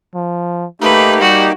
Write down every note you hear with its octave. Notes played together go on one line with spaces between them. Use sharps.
F3
A3 A#3 D#4 G4 B4
G3 F#4